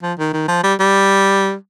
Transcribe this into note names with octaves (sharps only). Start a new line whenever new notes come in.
F3
D#3
D#3
F3
G3
G3